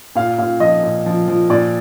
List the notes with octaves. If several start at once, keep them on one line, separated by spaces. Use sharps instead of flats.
A#2 F5
A#2 F5
F3 D#5
A#2
F3
F3
A#2 D5